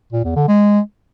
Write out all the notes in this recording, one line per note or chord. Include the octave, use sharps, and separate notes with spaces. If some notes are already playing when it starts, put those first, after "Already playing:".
A#2
E2
D3
G#3